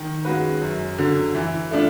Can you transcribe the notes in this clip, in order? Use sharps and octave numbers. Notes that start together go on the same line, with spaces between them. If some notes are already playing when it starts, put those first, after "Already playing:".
Already playing: D#3
G#3 C#4 F#4 B4
F#2
D3 F#3
E3
A3 D4 F4